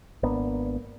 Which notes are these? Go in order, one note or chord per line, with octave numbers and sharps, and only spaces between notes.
G#1 A#3 B3 D4